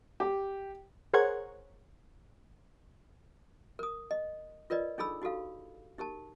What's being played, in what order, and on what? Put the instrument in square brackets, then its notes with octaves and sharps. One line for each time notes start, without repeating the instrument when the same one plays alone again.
[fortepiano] G4
[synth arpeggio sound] G#4 A#4 C5 C#5 F#5 G#6
[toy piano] A#4 D#6
D#5
F4 A#4 B4 D5 D#5
D4 D#4 G#4 A4 B5 E6
D#4 F#4 G4 A4 F5
D#4 G4 A#4 A5